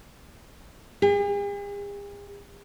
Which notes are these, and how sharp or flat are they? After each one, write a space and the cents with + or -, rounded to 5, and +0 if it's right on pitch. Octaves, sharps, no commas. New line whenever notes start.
G#4 -45